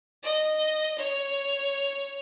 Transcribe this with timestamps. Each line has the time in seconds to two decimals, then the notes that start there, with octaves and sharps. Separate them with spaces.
0.23 D#5
0.98 C#5